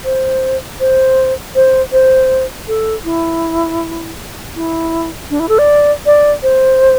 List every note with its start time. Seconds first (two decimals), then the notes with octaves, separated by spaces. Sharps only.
0.04 C5
0.80 C5
1.55 C5
1.92 C5
2.68 A4
3.05 E4
4.56 E4
5.30 D4
5.40 E4
5.49 A4
5.58 D5
6.06 D5
6.43 C5